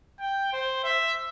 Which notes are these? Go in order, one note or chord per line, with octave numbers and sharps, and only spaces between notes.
G5
C5
E5